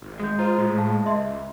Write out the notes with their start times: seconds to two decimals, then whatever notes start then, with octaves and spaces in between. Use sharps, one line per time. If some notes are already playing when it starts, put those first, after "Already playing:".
0.02 G#1
0.20 G#3 D#6 G6
0.39 F4 C5 A#5
0.58 A2
0.78 F5 A5
1.06 C#2 D#5 E5 C6